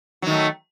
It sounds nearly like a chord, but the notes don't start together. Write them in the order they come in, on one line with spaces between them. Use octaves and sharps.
F#3 D#3 A3